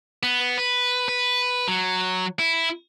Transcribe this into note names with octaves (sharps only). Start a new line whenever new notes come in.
B3
B4
B4
F#3
E4